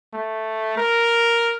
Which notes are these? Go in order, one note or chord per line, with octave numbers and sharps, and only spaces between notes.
A3
A#4